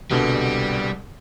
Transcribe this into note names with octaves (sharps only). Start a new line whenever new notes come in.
C2 B2 D3 G3